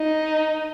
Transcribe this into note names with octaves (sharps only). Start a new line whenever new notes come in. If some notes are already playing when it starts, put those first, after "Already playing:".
Already playing: D#4